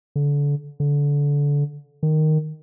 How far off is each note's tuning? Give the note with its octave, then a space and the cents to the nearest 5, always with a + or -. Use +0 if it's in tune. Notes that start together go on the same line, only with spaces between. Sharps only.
D3 -30
D3 -25
D#3 -5